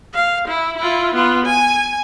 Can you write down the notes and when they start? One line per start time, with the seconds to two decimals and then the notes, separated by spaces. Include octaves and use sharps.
0.14 F5
0.48 E4
0.77 E4 F4
1.15 B3 F4
1.46 G#5